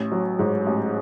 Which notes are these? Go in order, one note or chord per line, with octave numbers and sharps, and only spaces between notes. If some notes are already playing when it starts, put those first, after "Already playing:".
Already playing: A1
F#3
G#2
A1